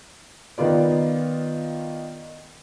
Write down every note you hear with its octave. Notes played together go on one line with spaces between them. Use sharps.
D#3 B3 F4 D5